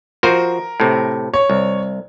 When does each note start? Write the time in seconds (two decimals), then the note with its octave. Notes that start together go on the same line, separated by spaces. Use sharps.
0.23 F3 F#4 A#4 C5
0.80 A2 C3
1.34 C#5
1.50 C2